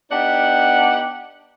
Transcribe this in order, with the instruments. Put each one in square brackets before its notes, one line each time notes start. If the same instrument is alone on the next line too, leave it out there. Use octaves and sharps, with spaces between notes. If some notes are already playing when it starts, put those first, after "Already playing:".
[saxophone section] B3 D4 D#4 G4 D5 F#5